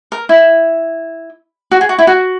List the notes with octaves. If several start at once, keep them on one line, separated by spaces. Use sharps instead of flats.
A#4
E4
F#4
G#4
F#4
E4
F#4